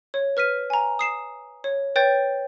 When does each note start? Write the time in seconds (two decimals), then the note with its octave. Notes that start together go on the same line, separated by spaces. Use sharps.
0.14 C#5
0.37 B4 F6 B6 D#7
0.70 G#5 A#5
0.99 D#6 C7 E7
1.64 C#5
1.96 B4 C#5 G5 G6 A6